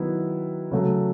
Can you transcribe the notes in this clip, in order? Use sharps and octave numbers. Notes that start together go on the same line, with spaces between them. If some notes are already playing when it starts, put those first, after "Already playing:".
Already playing: D#3 F#3 B3 E4
C#3 F#3 A3